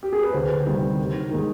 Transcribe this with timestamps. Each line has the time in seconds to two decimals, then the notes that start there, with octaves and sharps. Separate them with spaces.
0.03 G4
0.13 G#4
0.23 B4
0.33 D2 C5
0.66 C3 D#3 G3
0.99 D#2
1.31 D#3 G#3